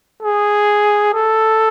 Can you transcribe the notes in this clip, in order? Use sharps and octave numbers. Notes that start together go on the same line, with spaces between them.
G#4
A4